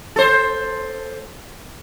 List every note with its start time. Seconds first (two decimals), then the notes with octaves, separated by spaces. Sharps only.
0.16 A4 C5